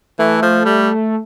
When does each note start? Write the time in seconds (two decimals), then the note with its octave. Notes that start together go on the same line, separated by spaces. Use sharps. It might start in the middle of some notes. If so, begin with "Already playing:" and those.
0.19 E3 A3
0.42 F3
0.65 G3